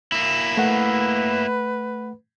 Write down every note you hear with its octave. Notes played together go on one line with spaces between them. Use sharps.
A#3 E4
A3 B4 F#5